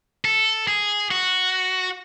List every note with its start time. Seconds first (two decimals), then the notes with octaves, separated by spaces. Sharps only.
0.25 A4
0.68 G#4
1.11 F#4